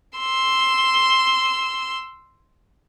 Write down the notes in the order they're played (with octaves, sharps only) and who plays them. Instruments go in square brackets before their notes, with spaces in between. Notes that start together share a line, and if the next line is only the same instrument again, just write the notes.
[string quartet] C6 E6